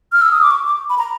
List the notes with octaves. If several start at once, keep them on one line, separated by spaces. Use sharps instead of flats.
F6
E6
D#6
D6
C#6
D6
B5
A#5